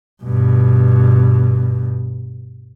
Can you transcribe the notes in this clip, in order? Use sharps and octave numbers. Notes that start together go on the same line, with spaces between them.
G2 B2